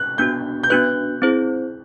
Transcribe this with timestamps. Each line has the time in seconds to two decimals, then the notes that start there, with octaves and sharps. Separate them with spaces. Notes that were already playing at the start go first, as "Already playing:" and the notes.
Already playing: F#6
0.18 B3 D4 F#4 G6
0.63 G6
0.70 B3 D4 F#4 B4 F#6
1.22 C4 E4 G#4 C5